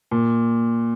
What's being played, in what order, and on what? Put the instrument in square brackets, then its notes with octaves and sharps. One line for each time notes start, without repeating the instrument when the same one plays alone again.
[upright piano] A#2